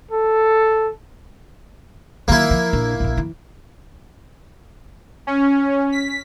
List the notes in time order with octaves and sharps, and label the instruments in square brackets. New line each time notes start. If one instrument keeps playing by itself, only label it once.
[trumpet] A4
[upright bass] D#3 F#3 [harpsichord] A#3 E4
[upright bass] F3
A#1
A#1 F#2
E3
[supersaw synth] C#4
B6